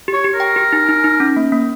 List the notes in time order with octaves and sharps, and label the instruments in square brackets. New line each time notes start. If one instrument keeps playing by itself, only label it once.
[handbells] G4
[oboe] C#5
[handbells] G4
[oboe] A#4
[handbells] G5
G4
D#4
D#4
D#4
C#4
A#3
A#3